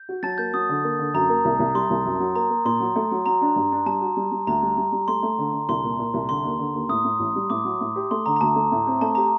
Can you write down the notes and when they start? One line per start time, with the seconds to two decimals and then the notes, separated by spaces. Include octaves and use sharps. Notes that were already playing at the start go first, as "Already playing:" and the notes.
Already playing: G6
0.09 F#4
0.23 F#3 A5 A6
0.38 A#3 G6
0.54 F#3 D#6
0.69 D3
0.84 A#3
0.99 D3
1.14 F#2 A#5
1.29 A#3
1.45 C2
1.59 C2
1.75 G3 C6
1.90 C2
2.05 F#2
2.20 F#3
2.35 A#3 A#5
2.50 A#3
2.65 A#2 C6
2.80 F#3
2.96 A3
3.11 F#3
3.26 F#3 A#5
3.42 D4
3.56 G2
3.72 D4
3.86 G3 A5
4.01 F#4
4.17 G3
4.32 G3
4.47 D2 A#5
4.63 G3
4.77 G3
4.92 G3
5.08 A3 C6
5.23 A3
5.38 D3
5.53 D3
5.69 C2 C6
5.84 A#2
5.99 A#2
6.14 C2
6.29 D3 C6
6.44 D#2
6.59 D3
6.74 D#2
6.89 A2 D#6
7.04 A2
7.20 A1
7.35 G3
7.50 A2 D6
7.65 F#3
7.81 A2
7.96 G4
8.11 A3 C6
8.26 D3 A#5
8.36 A#5
8.41 D2 A5
8.55 A3
8.72 A2
8.87 C4
9.01 A3 A5
9.15 G4 A#5